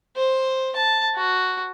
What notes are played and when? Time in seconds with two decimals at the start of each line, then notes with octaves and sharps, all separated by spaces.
0.16 C5
0.76 A5
1.16 F#4